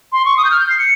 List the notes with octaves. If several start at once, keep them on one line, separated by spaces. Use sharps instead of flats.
C6
C#6
D#6
G6
F6
G6
C7
C#7